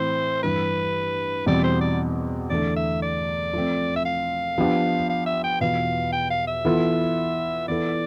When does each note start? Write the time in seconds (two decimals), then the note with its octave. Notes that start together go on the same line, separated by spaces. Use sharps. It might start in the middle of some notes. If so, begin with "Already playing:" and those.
Already playing: A2 E3 C4 C5
0.43 G2 E3 G3 B4
1.46 E2 B2 G3 C4 D5
1.64 C5
1.81 D5
2.50 E2 D3 A3 D5
2.76 E5
3.02 D5
3.53 F3 A3 C4
3.96 E5
4.06 F5
4.58 F3 B3 D4 G4
5.10 F5
5.26 E5
5.44 G5
5.61 E2 B2 B3 F4 B4 F5
6.13 G5
6.30 F5
6.48 E5
6.65 E3 B3 F4 A4
7.68 E3 B3 E4 A4 D5